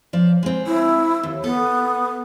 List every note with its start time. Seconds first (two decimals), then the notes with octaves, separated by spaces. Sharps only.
0.13 F3 D5
0.43 G#3 C4
0.67 E4
1.23 D#2
1.44 B3 A4